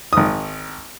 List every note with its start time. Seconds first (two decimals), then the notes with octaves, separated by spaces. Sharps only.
0.13 G#1 D#6